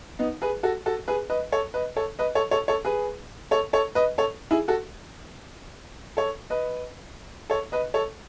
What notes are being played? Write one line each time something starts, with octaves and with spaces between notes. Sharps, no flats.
B3 D#4
G#4 B4
F#4 A4
F#4 A4
G#4 B4
B4 D#5
A4 C#5
B4 D#5
A4 C#5
B4 D#5
A4 C#5
A4 C#5
A4 C#5
G#4 B4
A4 C#5
A4 C#5
B4 D#5
A4 C#5
E4 G#4
F#4 A4
A4 C#5
B4 D#5
A4 C#5
B4 D#5
A4 C#5